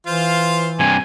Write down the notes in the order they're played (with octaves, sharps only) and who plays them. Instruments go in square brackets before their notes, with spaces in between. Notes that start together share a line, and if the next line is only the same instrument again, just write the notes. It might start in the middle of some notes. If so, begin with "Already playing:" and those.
[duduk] E3 [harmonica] F4 C5 F5
[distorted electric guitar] G2 C3 [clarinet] G#5